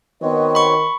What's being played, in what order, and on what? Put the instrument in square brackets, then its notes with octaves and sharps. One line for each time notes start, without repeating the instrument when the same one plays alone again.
[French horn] D#3 [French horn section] B3 D#5 [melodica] C4 F#4 C#5
[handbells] B5 C#6